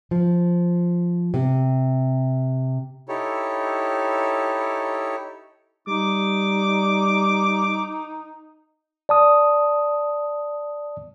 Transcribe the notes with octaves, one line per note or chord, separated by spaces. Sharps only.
F3
C3
D#4 E4 G4 A4 C#5
G3 D#4 D6
D5 A5 D#6